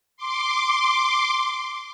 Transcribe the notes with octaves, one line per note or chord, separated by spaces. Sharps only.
C6 D6